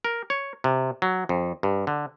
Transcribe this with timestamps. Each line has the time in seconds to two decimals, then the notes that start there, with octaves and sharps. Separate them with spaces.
0.04 A#4
0.30 C#5
0.64 C3
1.02 F#3
1.29 F2
1.63 G2
1.87 D3